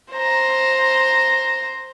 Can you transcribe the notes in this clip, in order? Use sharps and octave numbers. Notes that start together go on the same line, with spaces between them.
C5 A#5